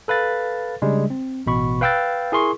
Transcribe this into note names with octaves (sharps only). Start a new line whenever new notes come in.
A4 B4 F5 A6
C#3 G3 G#3 D4
C4
A1 B2 B5 C#6
B4 F5 G5 E6 F#6 A6
E4 G#4 A#4 C6 C#6